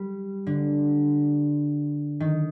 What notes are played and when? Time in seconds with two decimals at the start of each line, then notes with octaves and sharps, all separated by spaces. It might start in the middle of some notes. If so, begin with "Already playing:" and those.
Already playing: G3
0.47 D3
2.20 D#3